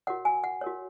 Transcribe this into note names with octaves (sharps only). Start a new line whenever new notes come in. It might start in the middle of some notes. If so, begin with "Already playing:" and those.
F#4 A#4 C#5 F#5
G#5
F#5
F#4 A#4 C#5